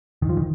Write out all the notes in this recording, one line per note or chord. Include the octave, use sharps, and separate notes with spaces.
D#3
F3
D#3